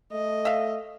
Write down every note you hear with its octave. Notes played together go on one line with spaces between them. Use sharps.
A3 D#5
E5 F5